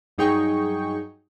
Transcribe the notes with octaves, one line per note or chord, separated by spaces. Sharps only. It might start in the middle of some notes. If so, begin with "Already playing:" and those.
G2 F#3 D#4 G#4 G5 C#6